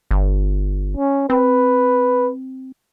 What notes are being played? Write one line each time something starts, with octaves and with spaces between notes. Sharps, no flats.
G1
C#4
C4 B4